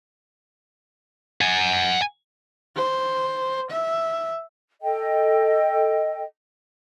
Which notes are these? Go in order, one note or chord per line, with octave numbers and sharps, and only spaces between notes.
F#5 G#5
C5
E5
A4 D#5 G5